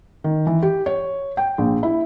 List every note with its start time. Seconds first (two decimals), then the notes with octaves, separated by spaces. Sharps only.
0.24 D#3
0.47 E3
0.62 G4
0.86 C#5
1.37 G5
1.58 A#1
1.83 E4